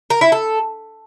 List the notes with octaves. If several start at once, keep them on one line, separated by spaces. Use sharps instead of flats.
A#4
E4
A4